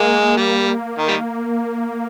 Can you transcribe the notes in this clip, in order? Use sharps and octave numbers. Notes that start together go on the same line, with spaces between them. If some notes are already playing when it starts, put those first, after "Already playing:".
Already playing: G#3 A#3
G3
D#3
G3